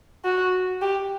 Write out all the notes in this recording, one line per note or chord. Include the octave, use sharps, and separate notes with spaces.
F#4
G4